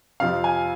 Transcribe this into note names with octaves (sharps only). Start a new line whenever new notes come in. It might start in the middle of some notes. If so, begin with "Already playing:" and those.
F2 C3 F3 F5
G#5